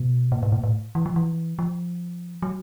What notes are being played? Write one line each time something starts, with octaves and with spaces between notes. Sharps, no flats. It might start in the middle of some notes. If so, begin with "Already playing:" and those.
Already playing: B2
A#2
A2
A#2
A2
E3
F3
E3
F3
F#3